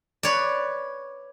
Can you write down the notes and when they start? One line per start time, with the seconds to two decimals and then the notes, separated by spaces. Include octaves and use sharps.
0.23 B4 C#5 D5